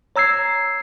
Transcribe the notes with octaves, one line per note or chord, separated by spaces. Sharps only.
C#5 A#5 E6 G#6 C7